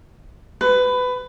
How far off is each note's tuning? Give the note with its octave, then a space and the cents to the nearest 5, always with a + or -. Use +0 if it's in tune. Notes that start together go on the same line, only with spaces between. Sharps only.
B4 +20